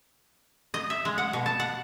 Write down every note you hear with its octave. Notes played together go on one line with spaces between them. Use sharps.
D#5
E5
G#3
F#5
B2
A5
F#5